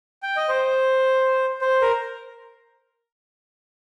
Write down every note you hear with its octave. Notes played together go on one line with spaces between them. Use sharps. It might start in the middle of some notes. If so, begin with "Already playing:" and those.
G5
D#5
C5
C5
A#4